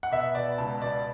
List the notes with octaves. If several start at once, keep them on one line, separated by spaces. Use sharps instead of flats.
F#5
B2 E5
B2 D5
C#2 A5
B2 D5